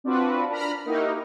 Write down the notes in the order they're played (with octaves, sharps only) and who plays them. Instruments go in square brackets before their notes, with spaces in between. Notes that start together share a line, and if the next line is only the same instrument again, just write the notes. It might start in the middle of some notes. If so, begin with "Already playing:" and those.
[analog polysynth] C4 D4 F4 F#4 B4 D5
D4 A#4 A#5 B5 F6
A#3 D#4 E4 F#4 G4 A#4